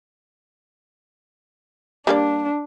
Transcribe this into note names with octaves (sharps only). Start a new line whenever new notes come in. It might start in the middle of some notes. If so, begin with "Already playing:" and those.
G3 A#3 D4 D5